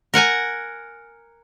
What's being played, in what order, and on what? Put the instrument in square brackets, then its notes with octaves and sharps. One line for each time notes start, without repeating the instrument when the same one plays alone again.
[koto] A#4 F#5 G#5 A#5